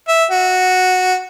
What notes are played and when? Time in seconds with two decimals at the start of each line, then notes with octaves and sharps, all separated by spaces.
0.08 E5
0.31 F#4